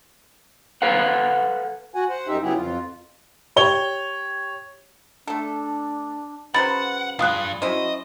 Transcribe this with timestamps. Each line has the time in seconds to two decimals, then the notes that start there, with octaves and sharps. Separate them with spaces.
0.82 A4 B4 F5 F#5
1.94 F#4 F#5 G#5
2.09 C5 F#5
2.28 F#2 D#4 G4 E5
2.42 C#3 F#3 B3 E4 G4 G#4
2.56 F2 F4
3.56 G4 C#5 G7
5.27 A3 D4 A4
6.54 C#3 F#3 B4 C5 F#5 B5 A6
7.19 C#2 G2 F4 G#4 F5 D#6 F#6
7.62 F#3 C#4 E4 C5 D#5